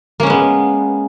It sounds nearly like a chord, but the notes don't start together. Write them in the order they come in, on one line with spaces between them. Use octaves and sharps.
A#3 C#4 G#3 B3